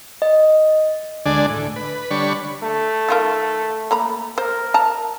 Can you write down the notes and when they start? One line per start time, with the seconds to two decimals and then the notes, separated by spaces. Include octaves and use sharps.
0.22 D#5
1.26 D2 D3 G#3 D4 D5 G#5
1.49 A2
1.76 B4
2.11 D3 G3 D4 C#5 B5 C#6
2.63 A3
3.09 D#3 F4 A#4
3.91 A#3 A#5 B5
4.38 A#4 C5
4.74 A5 A#5